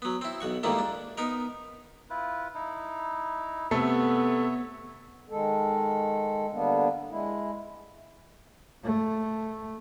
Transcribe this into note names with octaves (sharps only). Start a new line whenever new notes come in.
F#3 B3
C4 E4
B1 F#4 C#6
F2 G#2 D#3 G3 A#3 E4
D4
B3 D#4 A#4
E4 F4 B4
D#4 E4
C3 A3 B3 A4 C#5 E5
D#3 G#3 A4
D3 G3 A#3 B3 D4
G#3 E4
A3